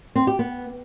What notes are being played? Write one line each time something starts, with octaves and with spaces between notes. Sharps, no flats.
C4
G4
B3